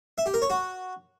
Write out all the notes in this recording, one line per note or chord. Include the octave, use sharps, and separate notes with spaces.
E5
G4
A#4
C#5
F#4